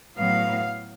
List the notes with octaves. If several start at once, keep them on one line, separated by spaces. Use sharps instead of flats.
A2 F#3 B3 F5